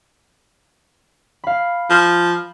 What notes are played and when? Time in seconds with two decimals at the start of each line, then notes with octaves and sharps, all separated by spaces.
1.44 F5 B5
1.90 F3